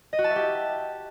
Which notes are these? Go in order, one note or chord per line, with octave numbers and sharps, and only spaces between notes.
D#5
F#4
A5
E5
G4